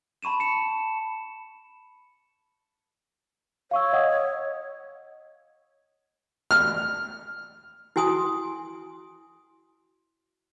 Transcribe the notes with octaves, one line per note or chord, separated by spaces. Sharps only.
A5 B5 C#6 D#7 E7
C#7 E7
C#5 F5 C#6 E6
D#5 F#5 D#6
F6
E4 F#4 G#5 C6 D#6